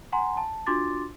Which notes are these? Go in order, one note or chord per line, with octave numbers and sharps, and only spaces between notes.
F#5 G#5 A#5 C6
A5
D4 F4 F#4 C6 D6 A6